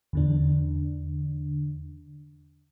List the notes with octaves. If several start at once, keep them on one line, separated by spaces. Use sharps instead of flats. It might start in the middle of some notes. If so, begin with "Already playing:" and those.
E2 D3 D4